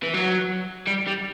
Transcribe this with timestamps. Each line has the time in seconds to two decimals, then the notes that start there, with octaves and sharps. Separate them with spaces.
0.03 E3
0.14 F#3
0.88 G3
1.07 G3